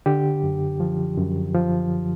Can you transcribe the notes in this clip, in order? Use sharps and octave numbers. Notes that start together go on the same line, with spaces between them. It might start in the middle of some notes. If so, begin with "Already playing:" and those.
D3 G4
F#2
F3
F#2
F3